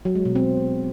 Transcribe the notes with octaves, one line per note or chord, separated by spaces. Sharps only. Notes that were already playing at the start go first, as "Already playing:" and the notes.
F#3
G#3
B2
C4